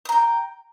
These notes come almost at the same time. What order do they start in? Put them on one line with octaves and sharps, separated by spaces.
D#6 A#5 G5